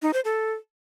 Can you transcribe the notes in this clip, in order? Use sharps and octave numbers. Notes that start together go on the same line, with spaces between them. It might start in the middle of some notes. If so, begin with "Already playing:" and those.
D#4
C5
A4